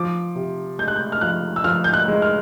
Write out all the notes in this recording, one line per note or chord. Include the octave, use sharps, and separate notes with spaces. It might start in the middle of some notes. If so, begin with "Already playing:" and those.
Already playing: F3 D6
C3
G#3 G6
F#6
G6
F6
F3 F#6
E6
F3 F6
G6
F#6
G#3
F6